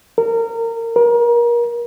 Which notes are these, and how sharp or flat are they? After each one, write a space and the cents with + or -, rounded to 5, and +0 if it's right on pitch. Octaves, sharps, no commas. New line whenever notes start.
A#4 -25
A#4 +30